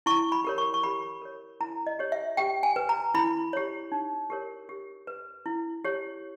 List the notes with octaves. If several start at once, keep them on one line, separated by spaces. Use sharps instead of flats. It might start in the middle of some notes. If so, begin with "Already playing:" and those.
E4 C#6
B5
G4 A#4 C#5
C#6
C#6
G4 B5
A#4 C#5
E4 A#5
D#5
G4 C#5
E5
G4 G5
G#5
B4
A#5
E4 B5
G4 C#5
D#4
G4 A#4 C#5
G4
B4
E4
G4 C#5